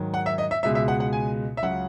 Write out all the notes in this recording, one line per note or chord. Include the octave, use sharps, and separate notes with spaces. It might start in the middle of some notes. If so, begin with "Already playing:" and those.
Already playing: G#2 D#3 F#3
F#5
E5
D#5
E5
C#2 B2 G#3 E5
E5
F#5
F#5
G#5
E5
C#2 C#3 F#3 F#5